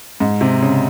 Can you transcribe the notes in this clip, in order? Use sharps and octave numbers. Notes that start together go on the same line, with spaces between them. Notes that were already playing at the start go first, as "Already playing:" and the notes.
G#2
C3
C#3